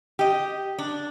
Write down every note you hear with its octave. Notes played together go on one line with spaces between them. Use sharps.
G4 D#5
D4